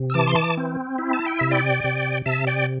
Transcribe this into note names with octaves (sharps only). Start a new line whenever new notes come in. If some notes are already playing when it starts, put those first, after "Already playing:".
Already playing: C3
E6
E3 A5 D6
C6
A5 D6
C4
E4
A5
G5
C3 E5
D5 G5
C3
C3 E5 A5
D5 G5